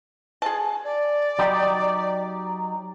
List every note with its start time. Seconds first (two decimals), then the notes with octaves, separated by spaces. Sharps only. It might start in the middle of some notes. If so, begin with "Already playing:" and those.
0.42 G#4 A5
0.84 D5
1.39 F#3 D#4 G4